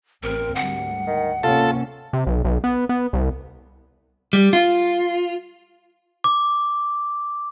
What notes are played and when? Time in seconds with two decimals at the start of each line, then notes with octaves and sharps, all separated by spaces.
0.23 A1 C4 A#4
0.56 D2 G#2 G3 F#5
1.07 D#3
1.43 C3 A#3 C#4 F4 A4
2.13 C3
2.27 B1
2.45 B1
2.64 B3
2.89 B3
3.13 C2
4.33 G3
4.53 F4
6.24 D6